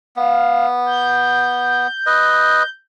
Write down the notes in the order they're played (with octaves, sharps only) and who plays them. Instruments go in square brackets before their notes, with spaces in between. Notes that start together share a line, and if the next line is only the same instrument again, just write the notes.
[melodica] B3 [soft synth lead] F5
[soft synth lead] G6
[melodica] B4 D#5